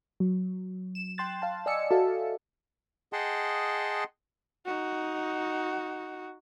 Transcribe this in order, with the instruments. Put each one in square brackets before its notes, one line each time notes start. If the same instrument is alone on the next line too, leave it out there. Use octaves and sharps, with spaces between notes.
[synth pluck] F#3
E7
G5 C6 F#6 A6 E7
F5 A5
D5 D#5 G#5 E6 C#7
F#4 A4 E5 F5 A5
[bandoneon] G#4 D#5 F#5 G5 A5 C6
[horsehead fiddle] D#4 F#4